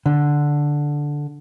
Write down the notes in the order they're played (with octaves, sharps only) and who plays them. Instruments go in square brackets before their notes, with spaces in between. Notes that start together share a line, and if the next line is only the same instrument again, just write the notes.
[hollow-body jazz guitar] D3